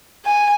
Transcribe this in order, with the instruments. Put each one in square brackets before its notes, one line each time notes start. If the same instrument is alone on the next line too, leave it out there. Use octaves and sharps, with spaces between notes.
[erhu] G#5